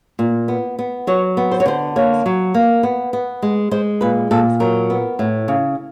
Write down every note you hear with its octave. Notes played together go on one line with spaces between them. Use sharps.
A#2
B3
B3
F#3 C#5
B3
C5
C#5
D3 C5
A#3 C#5
F#3
A#3
B3
B3
G#3
G#3 C5
A#2 B4
A#2 A4
F#3 A#4
B3
A2
C#3